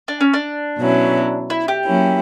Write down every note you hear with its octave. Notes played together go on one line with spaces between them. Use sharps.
D4
C#4
D4
B2 F#3 C#4 E4
E4
G4
F#3 A#3 C#4 E4